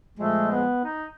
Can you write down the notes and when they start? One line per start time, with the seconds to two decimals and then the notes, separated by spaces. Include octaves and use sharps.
0.18 A#2 F3 G#3 A3
0.51 B3
0.85 D#4